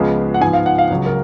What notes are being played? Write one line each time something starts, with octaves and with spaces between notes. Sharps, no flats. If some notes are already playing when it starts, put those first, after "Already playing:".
Already playing: C#2 C#3 F3 G#3 B3
F#5
G#2 F3 B3 G#5
F5
F#5
F5
C#2 C#3 F#3
A#4